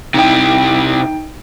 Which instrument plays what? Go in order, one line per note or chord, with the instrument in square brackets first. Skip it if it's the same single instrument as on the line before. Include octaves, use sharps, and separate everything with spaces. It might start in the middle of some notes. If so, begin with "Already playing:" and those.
[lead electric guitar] C3 E4 [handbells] D#4 G5